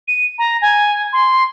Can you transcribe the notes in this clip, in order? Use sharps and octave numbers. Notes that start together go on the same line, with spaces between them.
D#7
A#5
G#5
C6